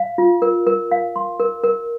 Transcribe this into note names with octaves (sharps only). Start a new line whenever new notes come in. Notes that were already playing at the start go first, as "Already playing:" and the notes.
Already playing: F5
F4
A#4
A#4
F5
C6
A#4
A#4